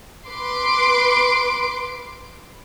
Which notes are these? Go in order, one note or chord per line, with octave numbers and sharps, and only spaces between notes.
B4 C6 D6